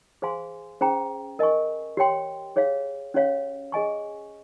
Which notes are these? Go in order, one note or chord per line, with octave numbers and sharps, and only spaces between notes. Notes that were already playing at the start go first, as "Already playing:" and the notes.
G#4 C5 F5 G#5 C6
C#4 G#4 C5 G5 A#5
A#4 D#5 G#5 C#6
G4 C#5 G5 C6
G#4 C#5 F5
C#4 G4 C#5 F5
G#4 D#5 G#5 C#6